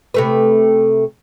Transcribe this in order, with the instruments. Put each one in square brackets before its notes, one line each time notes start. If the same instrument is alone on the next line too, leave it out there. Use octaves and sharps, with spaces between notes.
[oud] C3 A3 B4